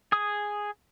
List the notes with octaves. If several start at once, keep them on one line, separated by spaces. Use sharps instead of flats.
G#4 D#6